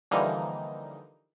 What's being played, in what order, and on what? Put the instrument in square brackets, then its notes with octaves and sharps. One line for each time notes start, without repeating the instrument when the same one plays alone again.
[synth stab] D3 E3 F3 G3 A#3 D#4